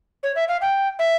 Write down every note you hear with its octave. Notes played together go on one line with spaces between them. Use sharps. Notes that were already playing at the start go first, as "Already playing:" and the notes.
C#5
E5
F5
G5
E5